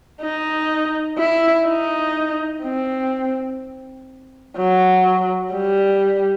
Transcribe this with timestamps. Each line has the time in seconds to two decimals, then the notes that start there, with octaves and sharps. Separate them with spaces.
0.22 D#4
1.18 E4
1.67 D#4
2.63 C4
4.57 F#3
5.54 G3